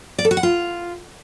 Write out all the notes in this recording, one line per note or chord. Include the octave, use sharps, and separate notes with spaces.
D5
A4
F#4
F#5
F4